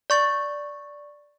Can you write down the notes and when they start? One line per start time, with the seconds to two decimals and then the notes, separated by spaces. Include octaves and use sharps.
0.10 D5 C#6 A6